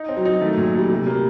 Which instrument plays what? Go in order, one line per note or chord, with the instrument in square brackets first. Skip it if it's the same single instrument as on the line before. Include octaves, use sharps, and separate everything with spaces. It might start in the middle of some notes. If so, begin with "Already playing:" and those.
Already playing: [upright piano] D#4
C4
[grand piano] F#3
[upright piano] D#4
[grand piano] D#3 [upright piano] A3
[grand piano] F#3
[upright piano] A#2
[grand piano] F#3
[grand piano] G3 [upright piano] A3
[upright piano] C3 [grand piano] G3
[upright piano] A#3
[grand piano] G3